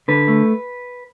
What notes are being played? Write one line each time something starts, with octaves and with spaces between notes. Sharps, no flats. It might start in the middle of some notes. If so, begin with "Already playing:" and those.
D3 B4
A3